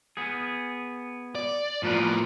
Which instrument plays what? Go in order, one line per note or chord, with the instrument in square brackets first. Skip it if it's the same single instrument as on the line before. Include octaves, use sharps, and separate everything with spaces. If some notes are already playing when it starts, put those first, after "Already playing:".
[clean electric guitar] B3 G#4
[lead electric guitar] D5
[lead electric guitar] A2 F4 [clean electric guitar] F3 A#4 B4